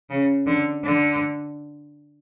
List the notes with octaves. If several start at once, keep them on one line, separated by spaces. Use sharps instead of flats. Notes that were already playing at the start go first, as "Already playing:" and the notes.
C#3
D3
D3